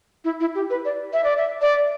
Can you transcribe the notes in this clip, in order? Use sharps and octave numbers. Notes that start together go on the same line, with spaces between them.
E4
E4
G4
B4
D5
E5
D5
E5
D5